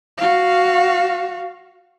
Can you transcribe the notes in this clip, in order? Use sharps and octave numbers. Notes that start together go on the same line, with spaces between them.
F#4 F5